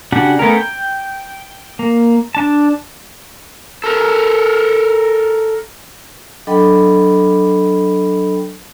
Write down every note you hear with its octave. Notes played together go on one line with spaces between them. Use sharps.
C#3 D4 F#4 G4 F#5
A3 B3 C#4 A#4
G5
A#3
D4 A5
A4 A#4
F#3 D4 A4 D#5 G5 B5